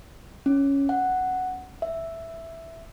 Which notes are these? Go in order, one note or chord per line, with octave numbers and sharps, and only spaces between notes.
C#4
F#5
E5